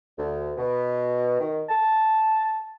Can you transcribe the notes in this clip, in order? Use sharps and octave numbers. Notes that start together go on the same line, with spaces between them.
D2
B2
D#3
A5